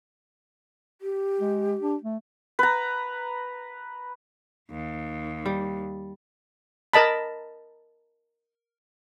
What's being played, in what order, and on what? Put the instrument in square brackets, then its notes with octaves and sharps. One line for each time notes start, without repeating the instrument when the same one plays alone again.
[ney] G4
[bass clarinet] G#3
D4
A3
[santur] B4 A#5
[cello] D#2
[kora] G3
[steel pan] A#4 D#5 A5 B5